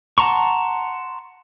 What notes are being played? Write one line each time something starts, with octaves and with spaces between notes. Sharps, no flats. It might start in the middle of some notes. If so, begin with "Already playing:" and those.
F#5 A5 A#5 C6 C#6